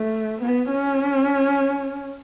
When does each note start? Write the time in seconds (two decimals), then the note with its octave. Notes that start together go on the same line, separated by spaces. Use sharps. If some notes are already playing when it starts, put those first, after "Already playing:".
Already playing: A3
0.42 B3
0.71 C#4